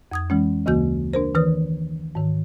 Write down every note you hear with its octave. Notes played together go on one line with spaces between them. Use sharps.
F2 D#6 G#6
E3 G#3 C#4
D2 C#3 E3 A#3 F#4 G6
D4 A#4 C5
D#3 E3 B4 D#6
G#2 D#3